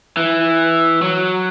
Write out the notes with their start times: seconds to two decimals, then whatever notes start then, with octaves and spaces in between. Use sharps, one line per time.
0.17 E3
1.02 F#3